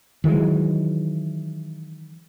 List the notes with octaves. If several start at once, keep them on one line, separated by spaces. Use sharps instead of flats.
D#3 E3 F#3 G#3